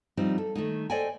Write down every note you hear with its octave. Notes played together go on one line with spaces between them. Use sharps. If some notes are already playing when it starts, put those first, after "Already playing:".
F3 G3 C4 D#4
A4
D#3 A3 D#4
A4 C5 D5 D#5 G5 G#5